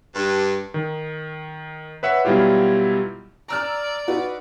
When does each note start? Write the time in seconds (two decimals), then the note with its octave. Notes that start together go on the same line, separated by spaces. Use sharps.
0.15 G2
0.74 D#3
2.03 B4 C#5 E5 F#5
2.25 B2 F#3 G3 E4 F4 G4
3.48 D5 A#5 E6 F6
4.07 D#4 F#4 B4